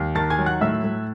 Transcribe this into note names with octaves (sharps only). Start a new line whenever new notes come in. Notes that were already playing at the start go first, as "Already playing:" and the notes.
Already playing: D#2
D#3 A5 A6
G#5 G#6
F#3
F#5 F#6
A2 E5 E6
A2